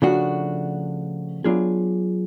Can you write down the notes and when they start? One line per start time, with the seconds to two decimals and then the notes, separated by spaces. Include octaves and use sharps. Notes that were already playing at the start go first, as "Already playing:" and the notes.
0.02 C#3 F3 A3 D4 F#4
1.44 F#3 B3 D4 F4 G#4